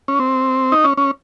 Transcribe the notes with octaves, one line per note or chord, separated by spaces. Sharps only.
C#4
C4
D#4
C#4
C#4